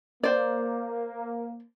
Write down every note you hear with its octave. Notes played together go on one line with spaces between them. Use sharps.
A#3 C5 D5